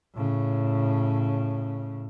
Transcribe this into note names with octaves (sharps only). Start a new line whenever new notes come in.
A2 C#3